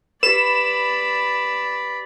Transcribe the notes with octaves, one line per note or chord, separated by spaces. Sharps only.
G4 B4 D5 B5 E7